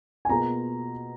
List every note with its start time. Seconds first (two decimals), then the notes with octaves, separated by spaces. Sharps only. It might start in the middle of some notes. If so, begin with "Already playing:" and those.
0.25 G#5
0.29 B2 A#3 F4 G#4 A#5